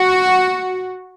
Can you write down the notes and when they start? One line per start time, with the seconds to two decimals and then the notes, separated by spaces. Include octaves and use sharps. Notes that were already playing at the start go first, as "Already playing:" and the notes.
Already playing: F#4